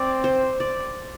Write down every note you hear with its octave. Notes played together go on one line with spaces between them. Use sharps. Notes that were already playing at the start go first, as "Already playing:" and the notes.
Already playing: C4 D5
C5
D5